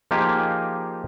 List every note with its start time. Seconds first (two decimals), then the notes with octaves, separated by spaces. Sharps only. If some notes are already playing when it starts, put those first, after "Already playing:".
0.11 F3 A#3 D#4 F4 G4 G#4